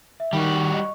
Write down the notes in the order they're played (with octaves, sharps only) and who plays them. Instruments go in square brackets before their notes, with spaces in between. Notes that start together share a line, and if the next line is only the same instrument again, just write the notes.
[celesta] E5
[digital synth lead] D#3 [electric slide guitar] G3 F#4 [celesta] G5
[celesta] D#5 C#6